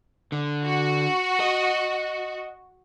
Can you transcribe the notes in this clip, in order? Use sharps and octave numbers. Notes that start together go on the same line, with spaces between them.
D3
F#4
D#5